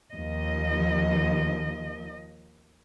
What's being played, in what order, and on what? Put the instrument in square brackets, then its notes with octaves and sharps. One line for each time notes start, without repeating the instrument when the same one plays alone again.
[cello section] D#2 F3 D#5